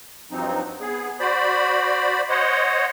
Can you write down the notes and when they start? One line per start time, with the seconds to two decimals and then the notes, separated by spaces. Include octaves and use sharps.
0.31 G2 F3 F#3 C4 D#4
0.81 B3 G#4
1.20 F#4 C5 D5 B5
2.29 C5 C#5 D#5 F#5